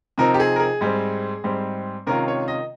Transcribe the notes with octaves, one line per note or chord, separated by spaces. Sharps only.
C3 F3 C4 D#4 A#4
G4
G#4
A#4
G#4
G#2 G3 C4
G#2 G3 C4
C3 D#3 G#3 C#4 F4 A#4
C#5
D#5